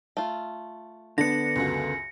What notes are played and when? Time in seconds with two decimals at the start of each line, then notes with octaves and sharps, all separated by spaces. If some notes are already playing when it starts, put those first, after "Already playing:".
0.17 A3 F4
1.18 D3 B3 D4 A#6 C#7
1.56 C#2 F#2 F#4